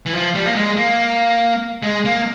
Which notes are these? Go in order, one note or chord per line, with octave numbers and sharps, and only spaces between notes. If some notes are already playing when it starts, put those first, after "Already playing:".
E3
F3
G3
A#3
G#3
A#3
G#3
A#3